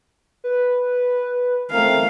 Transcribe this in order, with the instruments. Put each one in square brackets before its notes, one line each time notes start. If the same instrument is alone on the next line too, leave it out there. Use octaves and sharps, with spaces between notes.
[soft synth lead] B4
[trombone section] A3 C4 A#4 [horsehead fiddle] F5